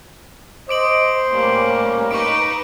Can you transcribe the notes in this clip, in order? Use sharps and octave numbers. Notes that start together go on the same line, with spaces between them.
C5 D#5 D6 D7 F#7
A2 G3 A#3 C#4
D#4 B4 C#6 D6 D7